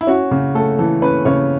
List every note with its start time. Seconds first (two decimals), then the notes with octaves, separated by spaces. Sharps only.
0.01 E4
0.07 C#4 F#4
0.31 C#3
0.55 A3 A4
0.79 E3 A4
1.02 C#4 B4
1.25 C#3 C#5